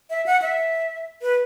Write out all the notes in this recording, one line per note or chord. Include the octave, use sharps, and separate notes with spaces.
E5
F#5
E5
B4